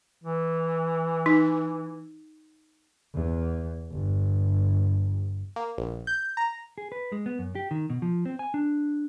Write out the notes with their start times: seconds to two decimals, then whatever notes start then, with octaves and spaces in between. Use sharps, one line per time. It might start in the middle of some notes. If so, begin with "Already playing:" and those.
0.24 E3
1.26 D#4
3.14 E2
3.91 G1
5.56 A#3
5.78 A#1
6.07 G6
6.37 A#5
6.78 G#4
6.92 B4
7.12 G#3
7.26 B3
7.39 F#2
7.55 G4
7.71 D#3
7.90 B2
8.02 F3
8.26 C4
8.39 G#5
8.54 D4